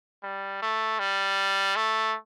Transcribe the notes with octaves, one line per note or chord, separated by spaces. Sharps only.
G3
A3
G3
A3